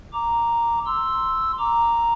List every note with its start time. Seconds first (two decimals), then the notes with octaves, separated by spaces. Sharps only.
0.13 A#5 D6
0.86 C6 E6
1.59 A#5 D6